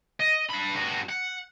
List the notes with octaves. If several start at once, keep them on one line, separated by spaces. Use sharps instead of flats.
D#5
D4 B5
G2 F#4
F#5